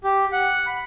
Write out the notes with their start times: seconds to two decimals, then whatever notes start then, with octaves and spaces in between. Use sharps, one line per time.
0.04 G4
0.32 F#5
0.67 B5